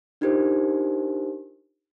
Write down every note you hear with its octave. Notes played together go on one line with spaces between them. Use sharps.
D4 D#4 F4 G4 A#4 C5